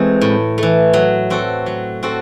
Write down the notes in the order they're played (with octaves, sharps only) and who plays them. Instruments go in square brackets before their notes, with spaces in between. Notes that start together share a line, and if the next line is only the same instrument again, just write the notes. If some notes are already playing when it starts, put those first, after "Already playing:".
Already playing: [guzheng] E3 A3 [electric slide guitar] G#3 C4
[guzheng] A2
E3 A3
F#3
C4 F#4 A4
F#3
C4 F#4 A4